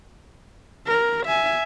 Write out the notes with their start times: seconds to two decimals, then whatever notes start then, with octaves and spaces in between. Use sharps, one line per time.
0.86 A#4
1.26 E5 G#5